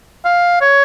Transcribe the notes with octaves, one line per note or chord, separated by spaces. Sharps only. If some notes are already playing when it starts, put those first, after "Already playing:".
F5
C#5